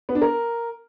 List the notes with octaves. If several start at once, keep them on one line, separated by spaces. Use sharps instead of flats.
B3
D4
A#4